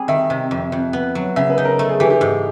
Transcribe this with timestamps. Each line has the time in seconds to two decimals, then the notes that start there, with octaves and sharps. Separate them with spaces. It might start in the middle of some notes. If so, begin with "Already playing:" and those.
Already playing: G3 C4 G#4
0.08 D#3 E5
0.30 C3
0.51 F2
0.72 F2
0.93 B3
1.15 F#3
1.36 C#3 E5
1.50 B4
1.58 D#4
1.65 A#4
1.78 A3 A4
1.89 G#4
2.00 E3 G4
2.10 G4
2.21 G#2